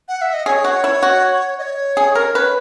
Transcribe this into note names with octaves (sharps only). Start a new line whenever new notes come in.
F#5
E5
D#5
G#4 C#5
F#4
E4
F#4
D#5
C#5
G#4
A#4
B4 C#5